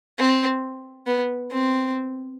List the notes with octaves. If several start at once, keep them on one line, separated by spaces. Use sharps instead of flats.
C4
B3
C4